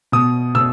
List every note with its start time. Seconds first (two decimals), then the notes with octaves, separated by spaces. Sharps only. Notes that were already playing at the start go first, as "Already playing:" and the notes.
0.12 B2 D#6
0.55 B2 E6